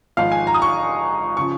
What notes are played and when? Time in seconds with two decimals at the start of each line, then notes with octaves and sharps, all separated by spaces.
0.17 G#1 G#2 F3 F5
0.32 G#5
0.47 A#5
0.54 D#6
0.62 C#6
1.37 C#3 F3 C#6